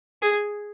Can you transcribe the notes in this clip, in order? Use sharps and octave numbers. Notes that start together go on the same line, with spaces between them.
G#4